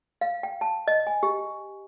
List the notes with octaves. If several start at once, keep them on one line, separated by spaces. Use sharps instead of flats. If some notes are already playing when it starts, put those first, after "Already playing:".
F5
G5
A5
D#5
G#5
G4